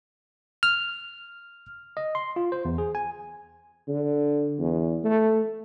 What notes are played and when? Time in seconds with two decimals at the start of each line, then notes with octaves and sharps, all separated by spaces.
0.63 F6
1.97 D#5
2.15 C6
2.36 F4
2.52 C5
2.65 E2
2.78 G#4
2.95 G#5
3.88 D3
4.59 E2
5.04 A3